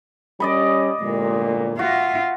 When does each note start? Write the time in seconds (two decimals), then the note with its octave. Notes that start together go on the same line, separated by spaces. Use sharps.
0.40 G3 C#4 D5 D#5 B5
1.01 G1 C2 A#2 G#3
1.79 F4 F#4 E5